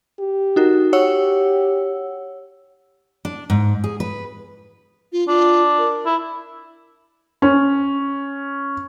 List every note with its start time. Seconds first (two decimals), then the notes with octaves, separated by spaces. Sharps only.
0.19 G4
0.56 D#4 F#4 A#4
0.93 G4 C#5 F#5 E6
3.25 D4
3.50 G#2
3.84 G#4
4.00 B4
5.12 F4
5.28 D4 F4
5.78 A#4
6.05 E4
7.42 C#4